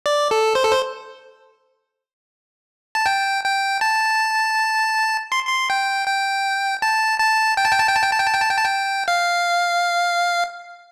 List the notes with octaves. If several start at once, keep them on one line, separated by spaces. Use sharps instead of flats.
D5
A4
C5
A4
C5
A5
G5
G5
A5
C6
C6
G5
G5
A5
A5
G5
A5
G5
A5
G5
A5
G5
A5
G5
A5
G5
A5
G5
A5
G5
F5